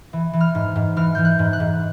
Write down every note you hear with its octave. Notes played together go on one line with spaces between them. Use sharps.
E3
E3
F6
G#2
G#2
E3 F6
E3 G6
F#6
G#2
F#6
G#2